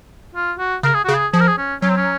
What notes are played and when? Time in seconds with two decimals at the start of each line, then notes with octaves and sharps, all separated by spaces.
0.35 F4
0.59 F#4
0.83 C#3 A#4
0.95 G#4
1.05 C#3 F#4
1.14 G#4
1.33 F3 G#4
1.41 A#4
1.48 G#4
1.58 C#4
1.82 F#3 C#4
1.90 C4
1.97 C#4